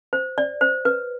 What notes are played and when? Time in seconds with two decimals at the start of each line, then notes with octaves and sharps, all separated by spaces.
0.13 C5
0.38 D5
0.61 C5
0.85 B4